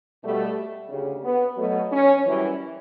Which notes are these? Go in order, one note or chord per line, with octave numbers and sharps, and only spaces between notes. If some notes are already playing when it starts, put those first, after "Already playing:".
B2 G3 A3
D2 C#3 G3
B3
B2 F#3 A3
C#4
F#2 E3 G3